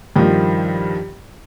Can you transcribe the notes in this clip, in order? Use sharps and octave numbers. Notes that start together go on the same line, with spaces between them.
G2 D#3 F3